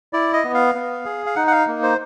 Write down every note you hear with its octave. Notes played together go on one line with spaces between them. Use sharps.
E4 D5
D#5
B3
F5
B3
G#4
F5
D#4 F#5
F#5
F5
A#3
C5